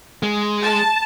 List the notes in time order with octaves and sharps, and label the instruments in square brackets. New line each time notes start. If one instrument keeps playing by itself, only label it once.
[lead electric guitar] G#3
[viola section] A5